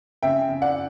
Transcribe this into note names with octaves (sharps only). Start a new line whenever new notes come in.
C#3 E5 G5
C#3
D5 F#5